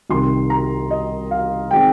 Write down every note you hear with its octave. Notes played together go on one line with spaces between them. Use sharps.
C2 C3 D#3 C6
A#5
D#5
F5
D#3 G#3 C4 G5